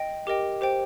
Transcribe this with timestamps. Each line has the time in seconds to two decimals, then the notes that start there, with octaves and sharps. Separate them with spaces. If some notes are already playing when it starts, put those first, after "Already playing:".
Already playing: D#5 G5
0.27 G4 A#4 D#5 G5 D6
0.61 G4 C5 G5